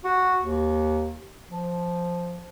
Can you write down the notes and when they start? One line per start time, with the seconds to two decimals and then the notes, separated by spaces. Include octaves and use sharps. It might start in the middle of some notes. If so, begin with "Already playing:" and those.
0.04 F#4
0.42 D#2
1.50 F3